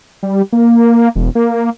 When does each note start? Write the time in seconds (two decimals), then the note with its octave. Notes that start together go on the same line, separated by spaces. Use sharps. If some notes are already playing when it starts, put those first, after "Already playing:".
0.23 G3
0.53 A#3
1.16 E1
1.35 A#3